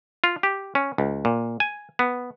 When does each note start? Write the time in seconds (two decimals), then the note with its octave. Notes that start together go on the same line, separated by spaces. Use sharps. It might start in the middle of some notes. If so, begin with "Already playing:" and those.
0.24 F4
0.43 G4
0.75 C#4
0.98 C#2
1.25 A#2
1.60 G#5
1.99 B3